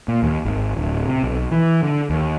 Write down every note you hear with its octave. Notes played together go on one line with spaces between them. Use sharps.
A#2
D#2
G#1
D1
C3
B1
E3
D3
D#2